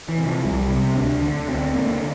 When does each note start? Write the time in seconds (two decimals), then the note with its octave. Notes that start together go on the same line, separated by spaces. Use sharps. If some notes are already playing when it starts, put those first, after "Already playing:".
0.09 E3
0.18 C3
0.27 F3
0.44 C2 G3
0.70 C3 C4
0.96 D2 D4
1.22 D3
1.48 D2 C4
1.74 D3 A#3